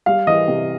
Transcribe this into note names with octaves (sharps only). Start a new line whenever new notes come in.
G3 F5
E3 D#5
C3